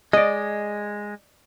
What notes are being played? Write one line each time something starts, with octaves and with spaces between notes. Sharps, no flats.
G#3 D5 D#5